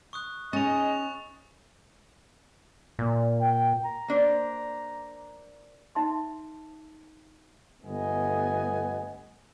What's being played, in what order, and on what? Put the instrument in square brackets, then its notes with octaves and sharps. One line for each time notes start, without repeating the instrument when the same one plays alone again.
[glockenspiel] C#6 D#6 F#6
[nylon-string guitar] C#4 [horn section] D#4 G#4 D#5 [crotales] C#6 F7 [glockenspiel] A6
[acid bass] A#2
[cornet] G5
[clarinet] A#5
[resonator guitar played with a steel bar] A#3 D4 C5
[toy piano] D#4 E5 A5 C6
[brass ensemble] G1 A3 B3 D#5 G#5